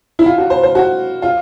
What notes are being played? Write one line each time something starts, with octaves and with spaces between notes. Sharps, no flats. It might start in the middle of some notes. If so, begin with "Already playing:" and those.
E4
F4
F#4
C5
C5
F#4
F4